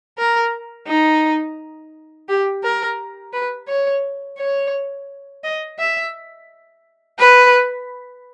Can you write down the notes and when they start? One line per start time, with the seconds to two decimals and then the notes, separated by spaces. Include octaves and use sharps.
0.18 A#4
0.87 D#4
2.29 G4
2.64 A#4
3.33 B4
3.68 C#5
4.38 C#5
5.44 D#5
5.79 E5
7.19 B4